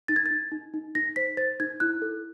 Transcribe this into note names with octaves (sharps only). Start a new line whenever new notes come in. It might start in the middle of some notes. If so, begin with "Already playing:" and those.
D#4 A6
G#6
D#4 A6
D#4
D#4
D#4 A#6
C5 B6
C5 A6
D#4 G#6
E4 F#6
A4